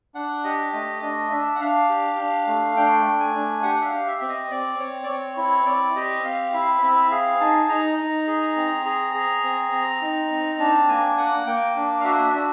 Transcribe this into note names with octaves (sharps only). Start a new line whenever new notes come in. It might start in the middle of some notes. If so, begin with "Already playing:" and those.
D4 F#5
G4 D#5
A3 D#5
D4 D#5
D4 E5
F#5
D4 F5
G4
D4
A3
D4 G5
A3
G#5
D4
G4 F#5
E5
F5
G4
E5
C4
D#5
C4 D5
C4 C#5
D5
C4 C#5
E4 C#5
C4 D5
G4 D#5
C4 F5
E4 E5
C4 E5
G#4 F5
D#4 A5
D#4 A#5
D#4
G#4
C4
G#4 A#5
G#4
C4
C4
D#4
C4
D4 A5
A#3 G#5
A#3 F#5
A#3 G5
D4
F5
F#4 E5
D4 E5